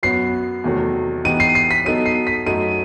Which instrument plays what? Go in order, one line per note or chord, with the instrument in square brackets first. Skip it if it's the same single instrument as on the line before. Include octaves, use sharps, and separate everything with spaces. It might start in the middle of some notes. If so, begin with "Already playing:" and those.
[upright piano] F#2 F#3 B3 F#4 B4 [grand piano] C7
[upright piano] E2 C3 D#3 F#3 A3
[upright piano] E3 B3 D#4 G4 [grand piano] D#7
[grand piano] C7
C7
B6
[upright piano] F#3 B3 D#4 A4 [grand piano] D#7
[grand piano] C7
B6
[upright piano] F#2 F#3 A3 D#4 F#4 [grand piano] D#7